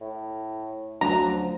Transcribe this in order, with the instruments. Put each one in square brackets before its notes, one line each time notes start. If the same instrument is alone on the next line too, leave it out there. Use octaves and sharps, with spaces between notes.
[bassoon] A2
[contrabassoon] D2 [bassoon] F3 [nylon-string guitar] F#3 C#4 [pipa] A#5